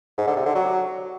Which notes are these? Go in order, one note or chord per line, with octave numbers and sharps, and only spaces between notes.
G#2
D3
C3
D3
F#3